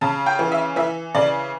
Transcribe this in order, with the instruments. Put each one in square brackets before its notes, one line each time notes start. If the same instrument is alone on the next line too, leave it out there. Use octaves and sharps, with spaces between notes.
[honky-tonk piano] C#3 A5
G5
E3
E5
E3 E5
C#3 D5